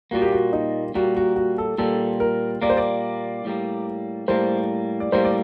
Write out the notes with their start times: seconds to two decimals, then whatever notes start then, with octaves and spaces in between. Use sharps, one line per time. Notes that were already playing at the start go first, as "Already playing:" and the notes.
0.11 A#2 G3 A#3 F#4
0.22 G4
0.32 F#4
0.53 D#4
0.95 A#2 G3 A#3 F#4
1.17 F#4
1.36 F#4
1.58 A4
1.78 A#2 G3 A#3 A4
2.20 A#4
2.62 A#2 G3 A#3 D5
2.70 C5
2.77 D5
3.45 A2 G3 A#3
4.28 A2 G3 A#3 C5
5.00 D5
5.12 A2 G3 A#3 C5
5.25 D5